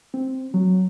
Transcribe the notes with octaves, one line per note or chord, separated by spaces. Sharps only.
C4
F#3